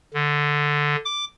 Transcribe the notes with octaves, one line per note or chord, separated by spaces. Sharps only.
D3
D6